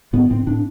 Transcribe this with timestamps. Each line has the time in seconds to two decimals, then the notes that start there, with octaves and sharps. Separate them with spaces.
0.13 A2 B3
0.30 A2 C4
0.46 A2 D4